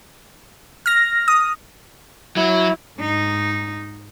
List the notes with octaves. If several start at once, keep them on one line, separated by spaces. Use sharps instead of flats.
F6 A#6
D#6
F#3 E4
G#2 D#4